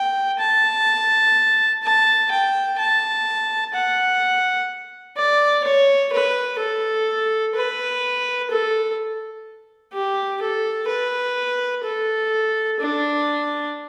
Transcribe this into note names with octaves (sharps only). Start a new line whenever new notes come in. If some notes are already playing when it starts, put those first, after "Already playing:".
Already playing: G5
A5
A5
G5
A5
F#5
D5
C#5
B4
A4
B4
A4
G4
A4
B4
A4
D4